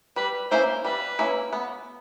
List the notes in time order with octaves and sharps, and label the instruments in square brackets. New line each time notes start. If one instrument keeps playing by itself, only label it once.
[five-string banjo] G3 [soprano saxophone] B4
[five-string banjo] A#3 C#4 E4 [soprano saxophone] C5
[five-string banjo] G3 [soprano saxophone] B4
[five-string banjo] A#3 C#4 E4
B3